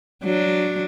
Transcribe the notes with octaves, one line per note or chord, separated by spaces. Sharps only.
F#3 D4